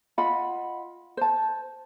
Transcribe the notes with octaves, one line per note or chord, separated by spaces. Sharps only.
F4 D#5 F#5 B5
C5 A5